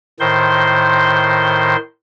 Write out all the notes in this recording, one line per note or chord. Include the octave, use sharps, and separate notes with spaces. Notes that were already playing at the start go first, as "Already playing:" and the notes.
A2 D#3 C5 C6